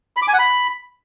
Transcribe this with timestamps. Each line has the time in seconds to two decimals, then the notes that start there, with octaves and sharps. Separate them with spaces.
0.17 B5
0.22 D6
0.28 G#5
0.33 F#5
0.39 B5